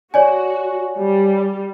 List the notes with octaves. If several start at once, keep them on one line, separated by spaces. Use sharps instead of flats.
F#4 C#5 D5 G#5
G3